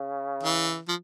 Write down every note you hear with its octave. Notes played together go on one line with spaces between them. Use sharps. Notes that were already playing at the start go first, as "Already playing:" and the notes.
Already playing: C#3
E3
F3